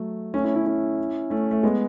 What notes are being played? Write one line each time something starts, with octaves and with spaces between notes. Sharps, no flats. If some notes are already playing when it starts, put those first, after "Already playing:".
Already playing: F#3 A3
A3 C#4
C#4 E4
C#4 E4
C#4 E4
A3 C#4
A3
G#3 B3